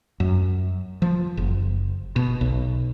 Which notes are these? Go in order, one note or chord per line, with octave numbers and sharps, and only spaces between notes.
F#2
F3
F#1
B2
B1